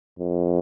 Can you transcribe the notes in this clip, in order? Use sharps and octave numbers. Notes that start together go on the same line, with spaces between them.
F2